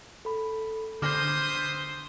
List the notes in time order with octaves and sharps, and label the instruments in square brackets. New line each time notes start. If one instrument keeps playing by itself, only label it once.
[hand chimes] A4 B5
[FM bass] D3 [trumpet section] G#4 B4 D#6 [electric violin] C5 [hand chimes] D6 F6 A#6